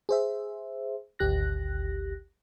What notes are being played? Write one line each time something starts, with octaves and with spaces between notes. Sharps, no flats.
G#4 C5 E5
G#1 D2 G4 F#6 A#6